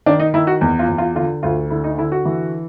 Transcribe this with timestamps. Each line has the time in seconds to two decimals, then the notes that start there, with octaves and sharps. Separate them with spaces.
0.06 D#3 D4
0.20 D#4
0.34 D#3 E4
0.47 F#4
0.61 E2
0.79 F4
0.88 E2
0.98 F4
1.15 D3 F4
1.43 D2 F4
1.70 D3 E4
1.84 D#4
1.98 D3 E4
2.12 F#4
2.25 E3